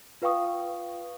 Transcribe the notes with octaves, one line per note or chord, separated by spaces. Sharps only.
F4 B4 F5 G5 C#6 D#6